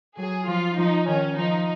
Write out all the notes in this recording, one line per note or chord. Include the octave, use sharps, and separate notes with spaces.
F#3 G#4
F3 F4
F3 D#4
D#3 C#4
F3 D#4